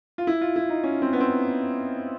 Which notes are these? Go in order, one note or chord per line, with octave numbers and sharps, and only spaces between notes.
F4
E4
F4
E4
D#4
C#4
C4
B3
C4